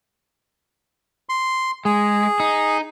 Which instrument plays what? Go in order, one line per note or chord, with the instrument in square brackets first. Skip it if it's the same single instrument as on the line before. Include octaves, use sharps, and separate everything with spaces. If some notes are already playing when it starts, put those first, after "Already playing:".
[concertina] C6
[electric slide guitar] G#3 [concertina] G#4
[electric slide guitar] D#4